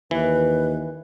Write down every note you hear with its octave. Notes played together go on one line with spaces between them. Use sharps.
D#2 E3 B4